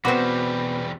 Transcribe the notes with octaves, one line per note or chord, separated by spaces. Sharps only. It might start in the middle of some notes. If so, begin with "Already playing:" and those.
E2 B2 G3 C4 F#4 B4 B5 D6